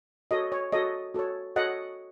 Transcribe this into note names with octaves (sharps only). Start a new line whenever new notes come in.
F#4 A4 C#5 D#5
C#5
F#4 A4 C#5 D#5
F#4 A4 C#5
F#4 A4 C#5 D#5 F#5